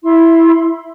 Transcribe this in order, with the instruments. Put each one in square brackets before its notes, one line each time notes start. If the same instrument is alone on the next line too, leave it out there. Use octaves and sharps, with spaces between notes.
[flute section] E4 B5 C6